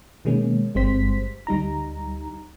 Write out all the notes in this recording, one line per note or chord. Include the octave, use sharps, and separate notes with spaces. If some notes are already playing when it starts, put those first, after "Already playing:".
B2 D#3 G#3 A#3 C#4
G1 G3 G#3 C4 C5 B6
D2 G3 D#4 A#5